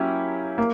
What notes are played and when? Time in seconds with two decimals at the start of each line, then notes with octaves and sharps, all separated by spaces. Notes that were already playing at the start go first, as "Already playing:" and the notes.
Already playing: F#3 A#3 C#4 E4 G4
0.58 A#3